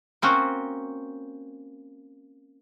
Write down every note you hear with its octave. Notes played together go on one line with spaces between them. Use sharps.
A#3 C4 C#4 F#4